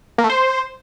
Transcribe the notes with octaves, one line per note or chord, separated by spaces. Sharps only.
A#3
A3
C5